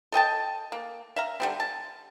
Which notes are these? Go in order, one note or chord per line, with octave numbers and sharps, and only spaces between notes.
A4 D#5 G5 A5
A#3
E5 F5 A#5
D3 G3 C4
A5